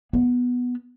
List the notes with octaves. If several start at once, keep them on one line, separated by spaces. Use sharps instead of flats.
B3